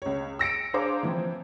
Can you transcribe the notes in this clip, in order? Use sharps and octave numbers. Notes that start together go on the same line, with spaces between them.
C#2 C#5
E6 A#6 C#7 D7
D4 G#4 C5 F5 A#5 D6
E3 F3 C4